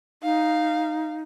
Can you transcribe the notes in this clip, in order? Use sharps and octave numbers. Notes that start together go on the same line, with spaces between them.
D#4 F5